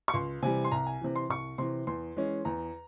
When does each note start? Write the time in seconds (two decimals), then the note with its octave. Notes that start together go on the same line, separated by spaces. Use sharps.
0.08 C#6
0.14 C#2 C6
0.43 C3 E3 G3 G#5
0.64 C6
0.72 C2 A#5
0.87 G#5
1.01 C3 E3
1.15 C6
1.29 C2 C#6
1.58 C3 E3 C6
1.87 E2 C6
2.16 E3 G#3 C#4
2.45 E2 A#5